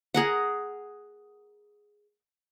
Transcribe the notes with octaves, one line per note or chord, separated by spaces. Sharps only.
G#4 A#4 F#5